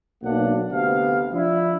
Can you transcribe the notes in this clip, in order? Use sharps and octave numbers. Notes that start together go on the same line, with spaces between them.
B1 A#3 D4 F#5
D2 C3 B3 F5
F3 D4 E4